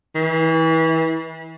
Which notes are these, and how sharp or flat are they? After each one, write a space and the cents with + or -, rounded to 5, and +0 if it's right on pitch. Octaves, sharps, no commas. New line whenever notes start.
E3 -30